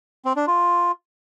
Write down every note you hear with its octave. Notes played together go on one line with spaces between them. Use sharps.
C4
D4
F4